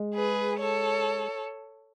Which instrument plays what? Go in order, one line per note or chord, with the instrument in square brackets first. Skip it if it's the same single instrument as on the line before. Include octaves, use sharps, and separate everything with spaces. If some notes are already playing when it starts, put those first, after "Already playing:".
Already playing: [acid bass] G#3
[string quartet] G#4 B4
A4 C#5